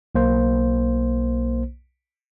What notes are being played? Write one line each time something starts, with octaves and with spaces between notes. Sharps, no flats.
B1 A#3 C5